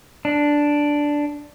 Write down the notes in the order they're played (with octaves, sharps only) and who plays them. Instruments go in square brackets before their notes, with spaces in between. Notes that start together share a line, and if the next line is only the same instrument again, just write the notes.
[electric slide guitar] D4